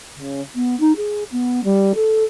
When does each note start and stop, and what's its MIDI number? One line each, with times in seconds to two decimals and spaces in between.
0.16 0.41 49
0.55 0.78 59
0.80 0.96 63
0.96 1.23 68
1.31 1.64 59
1.64 1.92 55
1.95 2.23 69